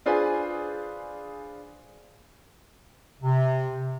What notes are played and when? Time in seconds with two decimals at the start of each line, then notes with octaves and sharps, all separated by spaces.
0.06 D4 F4 G#4 B4 C5 G#5
3.22 C3